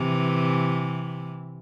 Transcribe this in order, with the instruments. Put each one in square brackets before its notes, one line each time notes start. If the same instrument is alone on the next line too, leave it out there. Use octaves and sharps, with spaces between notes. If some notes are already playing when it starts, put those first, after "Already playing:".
Already playing: [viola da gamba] C3 E3